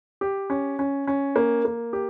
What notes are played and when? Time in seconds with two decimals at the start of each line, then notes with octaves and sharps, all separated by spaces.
0.21 G4
0.50 C#4
0.79 C#4
1.07 C#4
1.36 A#3
1.65 A#3
1.93 G4